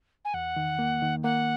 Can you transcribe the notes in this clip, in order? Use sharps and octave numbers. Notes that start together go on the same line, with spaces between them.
G#5
E2 F#5
D#3
A#3
D#3
A#3 F#5